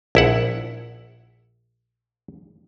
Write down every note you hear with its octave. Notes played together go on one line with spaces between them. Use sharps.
A#1 E4 F#5